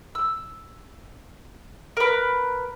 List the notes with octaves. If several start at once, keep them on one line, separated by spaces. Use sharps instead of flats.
E6
A#4 B4